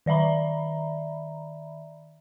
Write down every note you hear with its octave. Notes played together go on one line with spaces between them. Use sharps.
D#3 D5 E5 A#5 B5